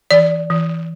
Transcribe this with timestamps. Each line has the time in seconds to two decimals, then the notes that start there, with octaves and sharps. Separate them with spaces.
0.11 E3 D5
0.50 E3